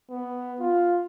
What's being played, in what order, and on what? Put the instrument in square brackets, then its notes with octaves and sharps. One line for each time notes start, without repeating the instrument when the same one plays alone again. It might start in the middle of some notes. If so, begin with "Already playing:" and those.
[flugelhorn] B3
F4